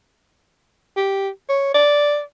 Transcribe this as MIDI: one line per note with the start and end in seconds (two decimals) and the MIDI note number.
0.96 1.29 67
1.49 1.72 73
1.74 2.21 74